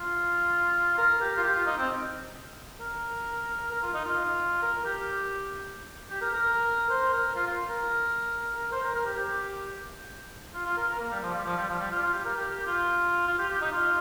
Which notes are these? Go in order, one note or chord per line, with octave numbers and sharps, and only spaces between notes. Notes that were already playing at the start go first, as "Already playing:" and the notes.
Already playing: F4
A#4
G4
F4
G4
F4
D#4
C4
A#4
A#4
F4
D#4
F4
A#4
G4
G4
A#4
A#4
C5
A#4
F4
F4
A#4
C5
A#4
A#4
G4
G4
F4
F4
A#4
A#4
A#3
G3
F3
G3
F3
G3
F3
G3
F4
F4
G4
A#4
G4
G4
F4
F4
G4
G4
D#4
F4